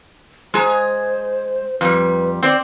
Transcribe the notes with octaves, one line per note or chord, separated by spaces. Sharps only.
G#3 G#4 C5 A#5
F2 G3 B4
C4 C5 D5